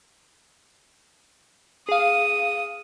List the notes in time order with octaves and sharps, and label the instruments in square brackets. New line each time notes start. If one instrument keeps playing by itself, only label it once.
[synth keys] G#4 F5 [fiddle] D#6